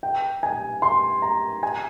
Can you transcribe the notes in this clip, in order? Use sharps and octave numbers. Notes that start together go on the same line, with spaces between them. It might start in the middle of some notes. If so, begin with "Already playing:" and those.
G5
G#5
C6
A#5
G#5